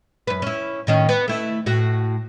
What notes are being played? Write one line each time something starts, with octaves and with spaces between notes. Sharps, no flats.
F#2 B4
C#4 E4
A2 D#3 C#4
B3
A3 E4
A2 F#4